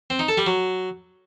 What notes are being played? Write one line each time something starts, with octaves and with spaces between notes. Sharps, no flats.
C4
D#4
A4
G3
F#3